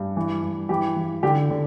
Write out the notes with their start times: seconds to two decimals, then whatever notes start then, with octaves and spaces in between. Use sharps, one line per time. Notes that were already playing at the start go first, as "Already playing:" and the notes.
Already playing: G2
0.17 E3
0.43 G2
0.69 E3 G4
0.96 E3
1.23 D3 G4
1.50 D3